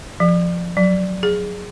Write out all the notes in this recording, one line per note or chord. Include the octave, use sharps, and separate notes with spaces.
F3
F#3
G#4